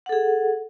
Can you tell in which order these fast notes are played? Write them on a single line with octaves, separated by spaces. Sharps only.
F#5 A4 G#4